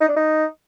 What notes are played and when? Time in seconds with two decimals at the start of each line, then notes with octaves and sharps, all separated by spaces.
0.01 D#4
0.08 D4
0.16 D#4